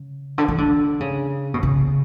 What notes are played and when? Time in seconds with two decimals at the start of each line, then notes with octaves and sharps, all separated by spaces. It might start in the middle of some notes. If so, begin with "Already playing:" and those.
Already playing: C#3
0.38 D3
0.48 E3
0.58 D3
1.00 C#3
1.54 B2
1.63 C#3